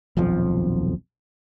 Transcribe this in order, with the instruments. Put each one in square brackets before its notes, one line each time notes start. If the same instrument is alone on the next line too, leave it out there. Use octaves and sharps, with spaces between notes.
[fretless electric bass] D#1 B1 F2 F3